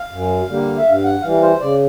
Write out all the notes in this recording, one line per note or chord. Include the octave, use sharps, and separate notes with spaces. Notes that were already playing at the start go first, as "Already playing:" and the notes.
Already playing: F5
F#2
D3 G3 A#3
E5
G2 F5
F#5
E3 G3 F5
C5
C#3 D5